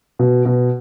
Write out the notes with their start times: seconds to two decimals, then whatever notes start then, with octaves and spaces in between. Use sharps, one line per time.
0.19 B2
0.45 B2